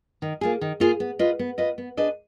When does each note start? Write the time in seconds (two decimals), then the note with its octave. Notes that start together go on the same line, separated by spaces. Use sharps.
0.22 D#3
0.41 A#3 F4 G#4
0.61 D#3
0.80 A#3 F4 G#4
1.00 B3
1.19 F4 B4 D#5
1.39 B3
1.58 F4 B4 D#5
1.78 B3
1.97 D4 G#4 B4 D#5